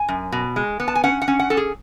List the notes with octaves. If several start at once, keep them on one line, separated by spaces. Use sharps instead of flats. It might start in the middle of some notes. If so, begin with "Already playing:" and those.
Already playing: G#5
F#2
B2
G#3
B3
A5
G#5
C#4 F#5
F#5
C#4
F#5
C#4 A4
G#4